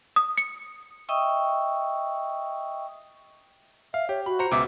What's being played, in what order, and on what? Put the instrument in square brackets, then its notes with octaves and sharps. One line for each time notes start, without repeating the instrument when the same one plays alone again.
[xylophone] D#6
C#7
[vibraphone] D#5 E5 G5 C#6 D#6 E6
[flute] E5 [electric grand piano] F5
[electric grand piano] G4 [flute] C#5
[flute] F#4 [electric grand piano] B5
[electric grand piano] C5 A#5 C#7
[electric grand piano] C#2 B2 E5 [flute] D6